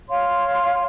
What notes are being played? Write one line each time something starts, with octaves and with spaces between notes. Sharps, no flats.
C#5 F5 C6